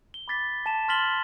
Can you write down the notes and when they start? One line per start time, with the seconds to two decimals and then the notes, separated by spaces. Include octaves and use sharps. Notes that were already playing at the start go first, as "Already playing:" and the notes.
0.14 G7
0.28 B5 D6 A6 B6
0.66 A5 E7
0.88 C6 F6 A6 B6 F#7 G7